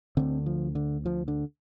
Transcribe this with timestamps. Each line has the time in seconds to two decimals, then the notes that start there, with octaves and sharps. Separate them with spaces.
0.17 D2 D3 C4
0.46 F3
0.75 D3
1.06 F3
1.28 D3